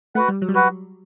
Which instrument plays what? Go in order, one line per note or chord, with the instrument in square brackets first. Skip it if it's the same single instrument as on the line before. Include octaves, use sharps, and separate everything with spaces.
[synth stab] A3 [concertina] F#4 B4 F#5
[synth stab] G3
F#3
G3
[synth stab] F#3 [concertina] F#4 B4 F#5